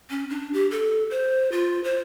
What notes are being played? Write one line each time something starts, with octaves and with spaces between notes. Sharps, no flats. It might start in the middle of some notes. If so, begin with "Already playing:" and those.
C#4
D4
G4
A4
C5
F4
C5